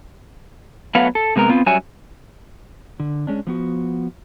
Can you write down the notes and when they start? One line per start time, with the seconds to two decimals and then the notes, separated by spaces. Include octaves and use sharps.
0.95 F#3 A3 B3 B4 F5 F#5
1.15 A4
1.36 C3 G#3 B3 A#4
1.50 B3 C4 F4
1.66 F#2 G3 F#4 C#5 E5 G#5
3.00 D3
3.27 G#3 C#4 D4
3.47 F3 B3 F#4